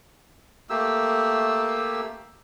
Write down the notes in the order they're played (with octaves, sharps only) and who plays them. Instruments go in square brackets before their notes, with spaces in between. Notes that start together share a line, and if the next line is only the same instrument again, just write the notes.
[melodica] A3 A#3 G4 E6